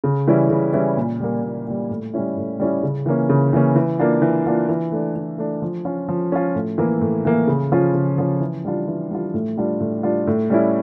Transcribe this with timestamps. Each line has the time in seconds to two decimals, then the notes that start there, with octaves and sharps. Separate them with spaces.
0.04 C#3
0.27 E3 G3 C#4 E4
0.50 C#3
0.73 E3 G3 C#4 E4
0.97 A#2
1.20 G3 A#3
1.43 A#2
1.67 G3 A#3
1.90 A2
2.14 G3 C#4 E4
2.37 A2
2.60 G3 C#4 E4
2.83 C#3
3.06 E3 A#3 C#4
3.29 C#3
3.53 E3 A#3 C#4
3.76 E3
3.99 A#3 D4 F4
4.22 E3
4.45 A#3 D4 F4
4.69 E3
4.92 A3 D4
5.16 E3
5.38 A3 D4
5.62 F3
5.85 C#4 F4
6.09 F3
6.32 C#4 F4
6.55 A2
6.78 E3 A#3 E4
7.01 A2
7.25 E3 A#3 E4
7.47 C#3
7.72 F3 C#4 F4
7.94 C#3
8.18 F3 C#4 F4
8.40 E3
8.65 G3 D4 F4
8.88 E3
9.11 G3 D4 F4
9.34 A2
9.57 G3 D4 F4
9.80 A2
10.03 G3 D4 F4
10.27 A2
10.50 G3 C#4 E4